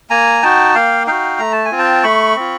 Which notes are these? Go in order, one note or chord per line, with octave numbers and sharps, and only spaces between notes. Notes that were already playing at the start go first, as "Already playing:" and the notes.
A#3 G#5 A#5
D#4 F#4 G5 A5
A#3 F5 G5
D#4 F#4 F5 G5
A3 A#5
A5
G#5
C4 F4
G5 A5
A3 B5 C#6
C4 F4